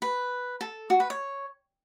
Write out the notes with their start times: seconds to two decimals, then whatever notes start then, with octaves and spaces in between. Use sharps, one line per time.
0.02 B4
0.61 A4
0.90 F#4
1.00 B4
1.10 C#5